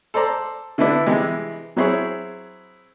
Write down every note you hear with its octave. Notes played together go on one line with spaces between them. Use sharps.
A4 C5 D5 A#5 C6
D3 A3 B3 D4 E4
C3 E3 G3 G#3
F#3 C4 E4 G#4 C#5